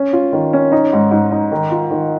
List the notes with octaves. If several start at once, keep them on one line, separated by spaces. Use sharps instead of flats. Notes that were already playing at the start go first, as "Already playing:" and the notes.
Already playing: C#4
F4
D#3
C#4
D#4
G#2
G#2
D#4
D#3
F4
D#3